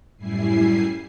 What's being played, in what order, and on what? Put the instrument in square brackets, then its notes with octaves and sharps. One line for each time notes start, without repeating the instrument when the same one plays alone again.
[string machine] F#2 A2 G3 E4 G#5 C7